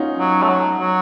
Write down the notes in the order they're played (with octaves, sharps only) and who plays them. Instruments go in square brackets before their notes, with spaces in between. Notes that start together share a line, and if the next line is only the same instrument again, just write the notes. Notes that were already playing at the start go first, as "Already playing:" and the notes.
Already playing: [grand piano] C#4 D#4 F4 F#4
[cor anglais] F#3
A3
F#3
F#3